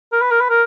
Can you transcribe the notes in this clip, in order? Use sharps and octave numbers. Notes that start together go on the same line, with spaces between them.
A#4
B4
A#4
B4
A#4